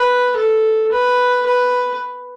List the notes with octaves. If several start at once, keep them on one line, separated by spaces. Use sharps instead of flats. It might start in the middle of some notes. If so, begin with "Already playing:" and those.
Already playing: B4
A4
B4
B4